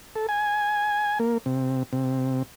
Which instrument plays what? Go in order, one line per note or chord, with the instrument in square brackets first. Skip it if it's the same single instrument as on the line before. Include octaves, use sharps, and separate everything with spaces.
[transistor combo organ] A4
G#5
A#3
C3
C3